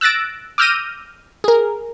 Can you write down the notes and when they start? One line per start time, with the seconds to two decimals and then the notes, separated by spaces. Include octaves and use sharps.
0.01 E6 F#6 A6 A#6 D7
0.58 D6 E6 F6 G6 A#6 D#7
1.44 G#4 A#4